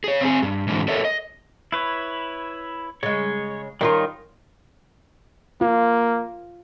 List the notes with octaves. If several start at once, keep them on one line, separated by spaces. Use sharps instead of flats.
G#4 C#5
C4 G#4
G2
G#2 D3 E3
A4 A#4 C#5 D#5 E5
D#5
E4 B4 C#5
C#3 G#3 C#5
D#3 G3 C#4 D#4 F4 A#4
A#3 F4